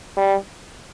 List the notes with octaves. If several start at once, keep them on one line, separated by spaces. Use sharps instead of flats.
G3